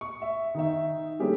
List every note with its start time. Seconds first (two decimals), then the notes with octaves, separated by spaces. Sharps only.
0.01 C#6
0.22 E5
0.55 D#3 D#4 E5
1.20 G3 A3 C#4 D4 G4 G#4